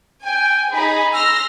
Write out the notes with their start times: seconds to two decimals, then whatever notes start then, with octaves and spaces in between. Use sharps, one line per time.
0.25 G5 G#5
0.73 D#4 G#4 B5
1.14 C6 E6 F6 A#6